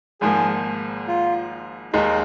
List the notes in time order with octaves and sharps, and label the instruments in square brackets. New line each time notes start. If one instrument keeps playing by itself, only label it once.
[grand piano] G#1 G#2 F3 A#3 [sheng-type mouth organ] G#4
[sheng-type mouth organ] F4
[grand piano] D#2 D#3 G#3 [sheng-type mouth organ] D#4